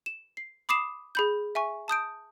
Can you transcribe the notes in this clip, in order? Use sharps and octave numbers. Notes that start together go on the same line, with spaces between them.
E7
C7
B5 D6 D#6 C7 E7
G#4 B5 G6
E5 G#5 C#6
A5 D#6 G6 D7